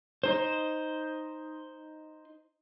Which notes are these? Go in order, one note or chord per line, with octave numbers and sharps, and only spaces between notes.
D#4 C5